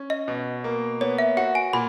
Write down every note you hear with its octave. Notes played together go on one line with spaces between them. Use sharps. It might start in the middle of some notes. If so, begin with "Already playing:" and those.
Already playing: C#4
D#5
B2
A#3
B3 C#5
E5
F#4 F#5
G#5
A#2 B5